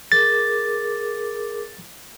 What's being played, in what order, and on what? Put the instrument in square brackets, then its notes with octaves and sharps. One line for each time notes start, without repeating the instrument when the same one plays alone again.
[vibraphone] G#4 A#4 D6 [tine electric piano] A6